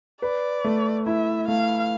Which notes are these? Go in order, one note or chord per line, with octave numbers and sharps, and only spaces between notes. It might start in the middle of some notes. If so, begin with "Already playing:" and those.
B4 D5
A3
E4 E5
A3 F5